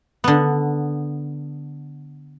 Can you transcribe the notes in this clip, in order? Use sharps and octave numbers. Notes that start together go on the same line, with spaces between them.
D3 B3